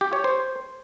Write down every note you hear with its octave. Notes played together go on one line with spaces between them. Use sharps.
G4
C#5
C5